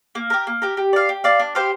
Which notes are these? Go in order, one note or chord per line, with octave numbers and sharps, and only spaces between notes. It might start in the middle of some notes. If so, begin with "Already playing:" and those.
A#3
G4 A#4
A#3
G4 A#4
G4
D5 F5
G4
D5 F5
D4
G4 C5 F5